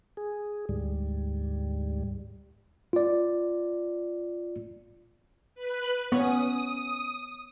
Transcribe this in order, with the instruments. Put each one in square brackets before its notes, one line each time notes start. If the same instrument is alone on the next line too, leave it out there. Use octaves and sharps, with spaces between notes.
[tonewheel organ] G#4
D2 G#2 G3
[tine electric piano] F4 D5
[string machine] B4 F#6
[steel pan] B3 [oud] C#4 [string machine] D#6